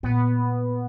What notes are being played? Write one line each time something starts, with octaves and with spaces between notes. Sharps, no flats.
A#2 B3